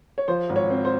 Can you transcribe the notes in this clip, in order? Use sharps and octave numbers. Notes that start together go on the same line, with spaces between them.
C#5
F3 C5
G#1
C#5
C4
C5